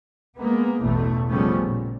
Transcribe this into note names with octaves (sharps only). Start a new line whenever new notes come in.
G#3 A#3 B3
A1 E2 B2 A3
C#3 F3 G3 A3 B3 C#4
A#2